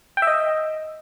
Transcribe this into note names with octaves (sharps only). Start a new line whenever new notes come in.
G5
E5
D#5